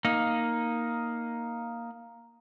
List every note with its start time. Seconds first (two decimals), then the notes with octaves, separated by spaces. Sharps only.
0.05 A#3 D#4